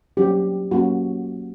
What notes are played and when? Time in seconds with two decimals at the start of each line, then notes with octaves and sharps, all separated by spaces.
0.17 F#3 A#3 C#4 G4
0.71 F#3 A#3 C#4 F#4